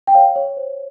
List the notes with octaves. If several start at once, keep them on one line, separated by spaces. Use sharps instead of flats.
G5
C#5 F5
C#5
C5